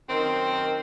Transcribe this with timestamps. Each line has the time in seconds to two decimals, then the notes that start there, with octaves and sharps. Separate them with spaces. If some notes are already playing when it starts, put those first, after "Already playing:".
0.09 F#2 D#3 C4